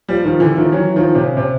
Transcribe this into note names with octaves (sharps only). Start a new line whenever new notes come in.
F3 G3
D#3 F3
D3 E3
D#3 F3
E3 F#3
D#3 F3
C3
C#3
C3